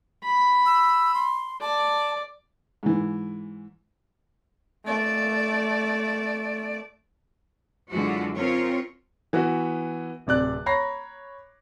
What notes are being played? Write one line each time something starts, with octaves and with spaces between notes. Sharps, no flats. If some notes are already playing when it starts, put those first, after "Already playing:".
B5
E6
C6
D5 A5
G#2 E3
A3 D5
F#2 D3 E3 G#3 F4 F#4
C4 C#4 F4 A#4 C#5
E3 B3 F#4
D1 C3 D5 F#6
C#5 A#5 B5 A#6 C7